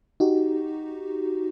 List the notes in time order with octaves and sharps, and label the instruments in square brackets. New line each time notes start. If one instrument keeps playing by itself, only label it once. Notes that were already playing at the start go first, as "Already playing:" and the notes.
[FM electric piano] D#4 F#4 G4